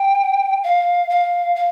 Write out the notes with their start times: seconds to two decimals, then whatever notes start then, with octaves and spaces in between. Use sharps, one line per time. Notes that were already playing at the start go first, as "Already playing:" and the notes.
Already playing: G5
0.64 F5
1.10 F5
1.56 F5